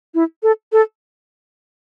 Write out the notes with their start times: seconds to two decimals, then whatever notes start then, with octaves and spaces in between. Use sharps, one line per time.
0.14 E4
0.43 A4
0.72 A4